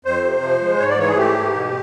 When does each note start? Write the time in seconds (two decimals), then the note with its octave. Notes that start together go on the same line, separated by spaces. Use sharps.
0.05 F2 C5
0.24 C3
0.42 F3
0.62 G#3
0.80 G#2 C#5
0.89 D5
0.98 E3 C#5
1.08 G#4
1.17 A3 G4
1.36 G#2
1.54 B2